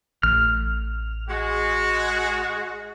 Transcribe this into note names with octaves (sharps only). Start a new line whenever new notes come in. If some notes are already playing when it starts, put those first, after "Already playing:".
A1 F6
G#3 F#4